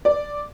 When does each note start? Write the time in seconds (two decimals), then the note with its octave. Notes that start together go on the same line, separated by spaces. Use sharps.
0.05 D5